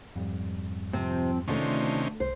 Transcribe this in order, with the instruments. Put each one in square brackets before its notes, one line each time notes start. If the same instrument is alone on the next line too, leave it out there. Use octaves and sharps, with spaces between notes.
[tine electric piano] F2 G#2 G3
[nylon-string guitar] C3 [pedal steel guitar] F3 C4
[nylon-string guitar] D2 A3 [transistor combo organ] C3 D#3 C#4 [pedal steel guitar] D4 F4
[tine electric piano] C2 [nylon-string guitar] C5